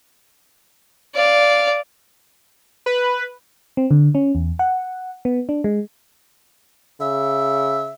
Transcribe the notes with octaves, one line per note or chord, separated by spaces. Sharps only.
D5 F5
B4
C4
D3
C#4
E2
F#5
B3
D4
G#3
C#3 E5